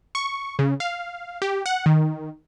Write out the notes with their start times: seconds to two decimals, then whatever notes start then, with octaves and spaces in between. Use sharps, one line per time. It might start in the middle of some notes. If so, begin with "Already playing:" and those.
0.15 C#6
0.59 C#3
0.80 F5
1.42 G4
1.66 F#5
1.86 D#3